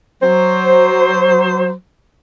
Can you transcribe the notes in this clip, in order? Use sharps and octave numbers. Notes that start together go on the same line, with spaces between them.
F#3 C5